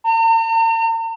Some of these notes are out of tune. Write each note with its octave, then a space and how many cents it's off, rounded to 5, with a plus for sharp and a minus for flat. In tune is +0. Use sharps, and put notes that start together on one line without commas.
A#5 -45